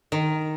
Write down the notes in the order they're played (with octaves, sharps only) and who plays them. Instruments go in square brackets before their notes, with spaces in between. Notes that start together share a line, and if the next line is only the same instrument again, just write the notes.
[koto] D#3